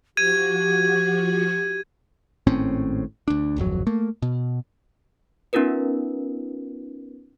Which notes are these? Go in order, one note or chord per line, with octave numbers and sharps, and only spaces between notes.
F3 F#4 G4 G#6 D#7
G#1 A2 C4 C#4
D2 D4
D1 G#1 F2 F#3
A3 A#3
B2
B3 C#4 D#4 F4 A#4 B4